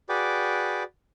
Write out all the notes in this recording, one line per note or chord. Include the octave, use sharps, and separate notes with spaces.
F#4 G#4 B4 D5 G5 D6